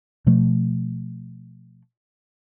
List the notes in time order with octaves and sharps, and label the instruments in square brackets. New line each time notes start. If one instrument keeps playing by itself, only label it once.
[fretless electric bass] B2 F3 A3